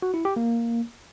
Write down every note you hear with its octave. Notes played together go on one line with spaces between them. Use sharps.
F#4
E4
G4
A#3